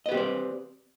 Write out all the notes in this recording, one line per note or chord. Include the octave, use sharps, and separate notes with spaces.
C4 G4 B4 D5 D#5